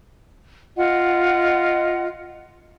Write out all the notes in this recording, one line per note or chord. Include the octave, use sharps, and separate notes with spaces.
F4 D#5 F#5